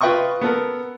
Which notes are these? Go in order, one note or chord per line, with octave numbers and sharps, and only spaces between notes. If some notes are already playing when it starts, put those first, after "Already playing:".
F4 B4 D#5 G5 C#6 D#6
B3 A4 A#4